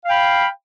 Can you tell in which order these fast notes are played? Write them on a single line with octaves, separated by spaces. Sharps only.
F5 G5 B5